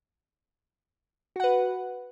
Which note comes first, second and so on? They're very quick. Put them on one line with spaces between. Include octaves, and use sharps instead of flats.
F#4 F#5 B4